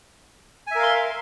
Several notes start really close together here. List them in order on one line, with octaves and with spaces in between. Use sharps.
G#5 E5 A#4 F5 C6